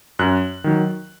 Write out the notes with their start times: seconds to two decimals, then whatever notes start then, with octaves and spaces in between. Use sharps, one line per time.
0.19 F#2 F#6
0.64 D#3 F#3